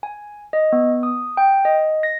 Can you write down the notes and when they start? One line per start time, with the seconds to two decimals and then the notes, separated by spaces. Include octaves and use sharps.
0.03 G#5
0.53 D#5
0.73 B3
1.03 D#6
1.37 G5
1.65 D#5
2.03 A#6